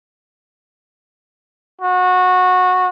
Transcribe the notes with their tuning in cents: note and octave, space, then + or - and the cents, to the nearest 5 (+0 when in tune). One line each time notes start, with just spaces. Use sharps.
F#4 -20